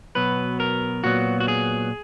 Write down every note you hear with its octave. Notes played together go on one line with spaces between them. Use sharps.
B2 F#3 B3 B4
A#4
A#2 F#3 B3 F#4
F#4
G#4